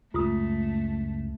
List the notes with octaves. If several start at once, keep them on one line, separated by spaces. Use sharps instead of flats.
C#2 F#2 A3 F4 D#6